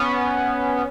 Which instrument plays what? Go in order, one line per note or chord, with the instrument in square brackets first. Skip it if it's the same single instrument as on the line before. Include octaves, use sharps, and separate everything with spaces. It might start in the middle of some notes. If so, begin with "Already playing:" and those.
Already playing: [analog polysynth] B3 C#4